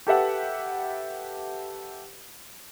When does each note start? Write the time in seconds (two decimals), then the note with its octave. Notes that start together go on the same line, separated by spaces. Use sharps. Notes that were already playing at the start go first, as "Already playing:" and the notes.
0.07 G4 A4 B4 E5 F#5